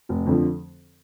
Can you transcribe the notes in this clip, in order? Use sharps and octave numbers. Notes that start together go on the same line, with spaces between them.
F1
F2 D3 F3